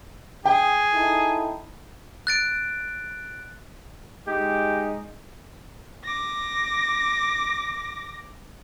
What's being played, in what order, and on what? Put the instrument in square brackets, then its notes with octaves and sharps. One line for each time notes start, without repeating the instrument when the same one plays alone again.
[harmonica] G#4 [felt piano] G5
[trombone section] D#4 E4 A4
[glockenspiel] F#6 A6 D7
[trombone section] G#3 D#4 [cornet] G4
[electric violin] D6 A#6